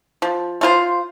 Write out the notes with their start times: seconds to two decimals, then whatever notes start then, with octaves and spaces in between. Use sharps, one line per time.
0.22 F3
0.61 A3 F4 C5